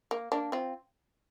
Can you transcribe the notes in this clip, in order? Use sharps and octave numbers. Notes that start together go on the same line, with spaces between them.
A#3
A#3 D4
C4 F4